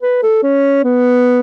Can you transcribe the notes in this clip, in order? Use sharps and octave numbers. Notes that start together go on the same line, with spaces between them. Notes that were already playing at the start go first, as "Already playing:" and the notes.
B4
A4
C#4
B3